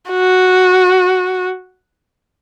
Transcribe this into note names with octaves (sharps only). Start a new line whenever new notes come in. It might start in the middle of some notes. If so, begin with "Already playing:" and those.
F#4